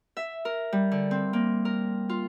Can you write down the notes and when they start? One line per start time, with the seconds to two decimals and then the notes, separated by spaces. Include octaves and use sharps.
0.17 E5
0.45 A#4
0.73 G3
0.92 D3
1.11 C4
1.33 A#3
1.65 A#4
2.09 F4